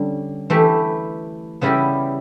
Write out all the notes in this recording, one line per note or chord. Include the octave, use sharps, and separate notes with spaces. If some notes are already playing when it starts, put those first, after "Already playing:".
Already playing: D3 G3 C#4
E3 A3 E4 G4
C#3 G3 B3 E4 G4